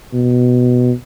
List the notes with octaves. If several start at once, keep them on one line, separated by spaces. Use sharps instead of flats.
B2